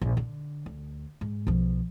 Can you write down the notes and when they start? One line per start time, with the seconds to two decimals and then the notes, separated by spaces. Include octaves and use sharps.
0.01 A#1
0.17 D3
0.66 D2
1.21 G#2
1.47 B1 F3